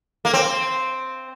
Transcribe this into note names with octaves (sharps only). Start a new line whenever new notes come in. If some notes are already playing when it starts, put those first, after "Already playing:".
A#3
C4